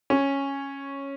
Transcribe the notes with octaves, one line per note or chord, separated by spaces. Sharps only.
C#4